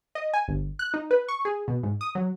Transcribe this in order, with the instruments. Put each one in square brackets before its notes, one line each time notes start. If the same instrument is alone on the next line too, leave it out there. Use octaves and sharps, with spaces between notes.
[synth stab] D#5
G#5
G1
F#6
D#4
B4
C#6
G#4
B2
G#2
D#6
F#3